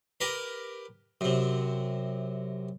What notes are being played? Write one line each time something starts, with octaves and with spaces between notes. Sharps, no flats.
G4 A#4 B4
F#2 C3